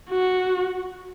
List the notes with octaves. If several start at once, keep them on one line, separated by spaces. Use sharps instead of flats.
F#4